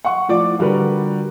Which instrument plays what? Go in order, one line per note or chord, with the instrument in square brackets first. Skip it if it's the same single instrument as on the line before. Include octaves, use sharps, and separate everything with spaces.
[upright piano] F#5 C#6
A2 F3 D5 D6
D3 G3 F#4 A#4 B4